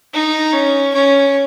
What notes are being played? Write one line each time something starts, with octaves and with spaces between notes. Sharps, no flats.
D#4
C#4
C#4